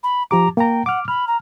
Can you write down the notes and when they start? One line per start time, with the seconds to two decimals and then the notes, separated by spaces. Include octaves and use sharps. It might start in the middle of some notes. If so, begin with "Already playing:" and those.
0.03 B5
0.31 F3 G4 A#5 D6
0.57 A#3 G5 A#5
0.86 F#5 D6 F6
1.08 B5 F6
1.27 A#5